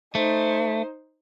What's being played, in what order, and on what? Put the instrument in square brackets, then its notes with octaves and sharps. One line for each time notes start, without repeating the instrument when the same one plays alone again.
[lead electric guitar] A3 [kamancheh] D#4 C5